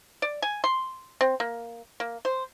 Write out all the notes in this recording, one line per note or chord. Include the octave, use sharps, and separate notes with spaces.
D5
G#5
C6
C4
A#3
A#3
C5